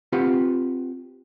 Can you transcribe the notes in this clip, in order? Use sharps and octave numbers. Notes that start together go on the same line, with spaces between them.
C4 F4 G4 B4 F#5